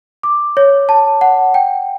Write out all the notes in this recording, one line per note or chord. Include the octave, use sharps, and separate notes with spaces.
D6
C#5
A5
F#5
G5